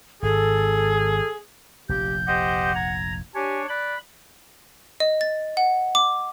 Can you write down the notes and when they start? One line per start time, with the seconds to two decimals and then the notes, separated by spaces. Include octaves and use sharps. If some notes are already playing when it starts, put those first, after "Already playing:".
0.23 G#1 G#2 G#4 A4
1.89 F1 A#1 G4 G6
2.27 G4 C5 D#5 F#5
2.75 A#5 G#6
3.35 D4 G4 C#5 G#5
3.69 D5 B5 F#6
5.00 D#5
5.21 A6
5.57 F#5
5.95 D6